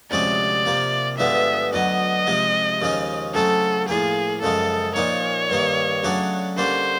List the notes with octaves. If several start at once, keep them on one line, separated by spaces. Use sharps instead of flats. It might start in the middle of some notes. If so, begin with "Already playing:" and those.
D2 C3 F3 G#3 C#4 D5
C3 F3 A#3
G2 D3 F3 G#3 B3 E5
D2 D3 F#3 B3 D#5
C3 F3 G#3
D#2 C#3 F3 G#3 C#4
C#3 F#3 A3 C4 A4
A2 F3 A#3 G#4
F#2 C#3 F3 G#3 A4
A#2 F3 A#3 D#4 C#5
G2 D#3 G3 A#3
C#3 F#3 A3 D4 F#4
D3 G3 A#3 C#4 C5